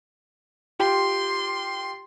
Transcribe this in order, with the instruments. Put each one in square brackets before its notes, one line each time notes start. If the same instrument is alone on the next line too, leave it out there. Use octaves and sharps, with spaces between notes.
[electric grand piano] F4 G4 G5 [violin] C6